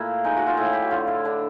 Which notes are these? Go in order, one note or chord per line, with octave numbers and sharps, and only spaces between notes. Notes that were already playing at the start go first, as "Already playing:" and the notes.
Already playing: A#2 A3 E4
G#3 D#4
F#4
F4
A2 E4
G4
F#4
D3 F4
E4
D3 D4